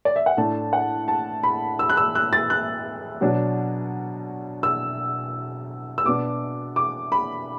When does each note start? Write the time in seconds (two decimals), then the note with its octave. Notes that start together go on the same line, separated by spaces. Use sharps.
0.05 D5
0.16 E5
0.26 F#5
0.37 A2 A3 D4 A5
0.73 F#5
1.08 A5
1.43 B5
1.79 E6
1.90 F#6
1.97 E6
2.15 F#6
2.33 A6
2.50 F#6
3.21 B2 F#3 D4
4.63 E6
5.98 E6
6.05 B2 B3 D4 D6
6.76 D6
7.12 B5